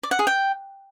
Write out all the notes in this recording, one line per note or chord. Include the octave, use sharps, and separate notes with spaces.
D5
F#5
G#4
G5